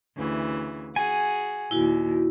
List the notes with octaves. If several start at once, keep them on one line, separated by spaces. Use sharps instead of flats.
D2 C#3 E3
F#4 G#4 G#5
D#2 A#2 E4 F#4